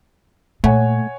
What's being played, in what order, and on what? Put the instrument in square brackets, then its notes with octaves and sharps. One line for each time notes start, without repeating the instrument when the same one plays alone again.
[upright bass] A#2 [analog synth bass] A3 [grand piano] C#5 F#5 G#5